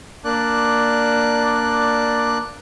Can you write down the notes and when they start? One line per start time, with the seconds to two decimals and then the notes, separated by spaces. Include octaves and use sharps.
0.24 A#3 D4 D5 F#6